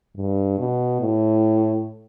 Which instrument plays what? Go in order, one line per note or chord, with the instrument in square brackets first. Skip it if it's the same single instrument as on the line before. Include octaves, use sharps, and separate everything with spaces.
[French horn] G2
B2
A2